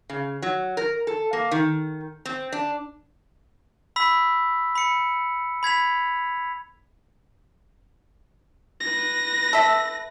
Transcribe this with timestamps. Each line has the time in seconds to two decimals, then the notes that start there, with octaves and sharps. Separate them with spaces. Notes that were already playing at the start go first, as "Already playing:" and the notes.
0.10 C#3
0.42 F#3
0.77 A#4
1.07 A4
1.33 A#3
1.51 D#3
2.25 C4
2.52 D4
3.96 B5 E6 B6
4.75 B5 C#7
5.63 B5 G#6 B6 F7
8.80 B4 A#6
9.53 A4 E5